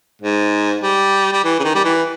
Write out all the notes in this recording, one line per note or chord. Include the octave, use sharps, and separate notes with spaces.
G#2
G3
G3
E3
C#3
D#3
G3
E3